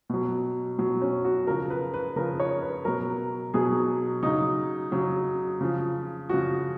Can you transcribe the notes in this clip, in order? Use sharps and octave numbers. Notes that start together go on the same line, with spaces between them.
B2 F#3
B2 F#3
C#4
F#4
C#3 F3 A#4
B4
B4
C#3 F3 A#4
C#5
B4
B2 F#3 A#4
B2 F#3 G#4
C#3 F#3 D#4
C#3 F#3
C#3 F3
C#3 F3 F#4